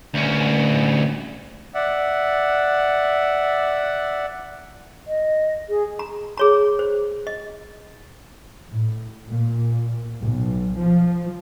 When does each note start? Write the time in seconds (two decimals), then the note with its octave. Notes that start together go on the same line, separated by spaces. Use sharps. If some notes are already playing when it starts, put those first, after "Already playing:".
0.14 D2 C#4
1.75 D5 E5 F#5
5.08 D#5
5.69 G#4
5.99 A#5
6.37 G#4 C#5 A#5
6.79 C5
7.27 D#5
8.70 A2
9.31 A#2
10.21 B1
10.78 F3